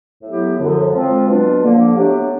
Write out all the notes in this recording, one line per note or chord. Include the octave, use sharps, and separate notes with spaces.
A2 F#3 B3 E4 G4
F#2 D3 F3
F3 G#3 C4 F4
B2 F#3 B3 D4 F4
D3 F3 A#3
A2 F#3 B3 D4 G4